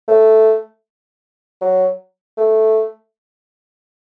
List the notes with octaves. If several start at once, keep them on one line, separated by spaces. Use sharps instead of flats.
A3
F#3
A3